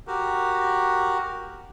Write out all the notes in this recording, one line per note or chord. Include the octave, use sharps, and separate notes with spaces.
F#4 G4 A#4